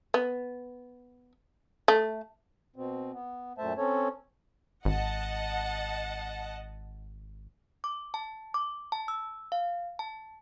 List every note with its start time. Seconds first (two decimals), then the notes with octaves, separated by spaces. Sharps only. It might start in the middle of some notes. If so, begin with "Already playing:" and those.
0.14 B3
1.88 A3
2.76 B2 C4
3.13 B3
3.58 F#2 A#2 A3 C5 E5 A5
3.78 C4 C#4 A4 C#5
4.85 G#1 D#5 F#5 A5
7.84 D6
8.14 A5
8.54 D6
8.92 A5
9.08 E6
9.52 F5
9.99 A5